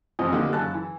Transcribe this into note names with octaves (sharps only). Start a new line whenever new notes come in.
A1 F2 C3 E3 F3 D#5
D3 A#3 D#4 G4
F#2 C#3 A5 F#6
E3